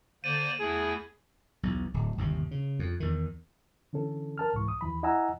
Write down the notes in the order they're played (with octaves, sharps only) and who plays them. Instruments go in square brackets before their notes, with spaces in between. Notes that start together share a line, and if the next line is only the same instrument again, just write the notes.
[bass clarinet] D3 [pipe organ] A#3 C5 D5 [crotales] D#7
[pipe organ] E2 E4 [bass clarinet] A3 [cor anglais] G#4
[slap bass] B1 E2
D1
G1 D#2 C3
C#3
F2
E2 D#3
[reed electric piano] D3 E3 C#4 A4
A#4 A5 F6
C2 G#2 E3 C#6
D#6
D#2 E3 B5
E4 D#5 F#5 G#5 A#5 E6